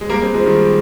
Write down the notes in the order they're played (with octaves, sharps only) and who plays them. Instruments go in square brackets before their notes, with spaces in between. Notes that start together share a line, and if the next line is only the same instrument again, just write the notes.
[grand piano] G#3
G3 A#3
G#3 C4
F3 G#3
D#3 G3